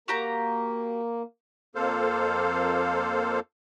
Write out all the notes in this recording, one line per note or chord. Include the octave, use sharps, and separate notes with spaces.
A#3 F#4 G4 A#5
F2 A#3 A4 C5 F5